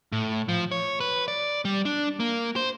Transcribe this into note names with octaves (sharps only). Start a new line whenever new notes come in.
A2
F3
C#5
B4
D5
G3
D4
A#3
C5